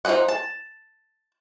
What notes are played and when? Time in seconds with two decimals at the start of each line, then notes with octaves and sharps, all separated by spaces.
0.05 F3 D#4 E4 D#5 F#5
0.28 A5